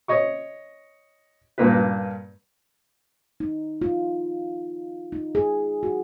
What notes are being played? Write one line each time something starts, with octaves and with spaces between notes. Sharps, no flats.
C#5 D#5 C#6
G2 A#2 A#3 B4
D#4
F4
D#4
G#4
F#4